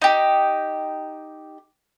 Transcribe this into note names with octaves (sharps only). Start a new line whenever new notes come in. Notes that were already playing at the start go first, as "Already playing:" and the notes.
D#4 G4